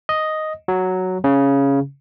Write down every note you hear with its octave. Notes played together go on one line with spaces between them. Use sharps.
D#5
F#3
C#3